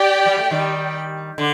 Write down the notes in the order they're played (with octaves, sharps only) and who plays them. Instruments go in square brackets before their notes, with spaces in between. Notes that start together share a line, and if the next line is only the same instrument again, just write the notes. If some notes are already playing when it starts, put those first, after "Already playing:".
Already playing: [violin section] G4 D5 G5
[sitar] G3
A3
D#3 G3
D3